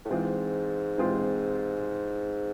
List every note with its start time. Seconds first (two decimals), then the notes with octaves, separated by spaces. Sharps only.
0.05 A2
0.10 G#2 E3 G#3 C4 F4 G#4
0.97 E3 G#3 C4 F4 G#4